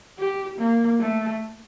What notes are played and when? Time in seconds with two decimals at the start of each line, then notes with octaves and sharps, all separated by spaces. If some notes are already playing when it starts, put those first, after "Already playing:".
0.18 G4
0.59 A#3
0.99 A3